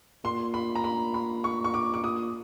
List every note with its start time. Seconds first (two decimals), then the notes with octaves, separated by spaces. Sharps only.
0.24 A#2 C6
0.54 B5
0.75 A#5
0.84 B5
1.14 B5
1.44 C#6
1.64 C#6
1.74 D6
1.94 D6
2.03 A#2 D#6